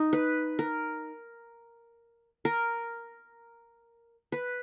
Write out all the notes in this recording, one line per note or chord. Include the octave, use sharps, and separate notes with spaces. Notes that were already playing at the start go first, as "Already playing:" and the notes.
Already playing: D#4
B4
A#4
A#4
B4